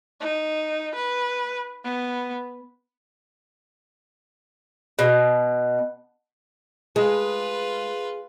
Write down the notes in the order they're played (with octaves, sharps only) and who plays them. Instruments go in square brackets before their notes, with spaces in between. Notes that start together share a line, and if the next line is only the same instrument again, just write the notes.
[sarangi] D#4
B4
B3
[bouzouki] B2
[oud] G#3 [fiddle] F4 B4 [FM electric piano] G#4